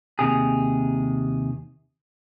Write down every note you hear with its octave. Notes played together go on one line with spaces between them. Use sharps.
D#2 C3 G#4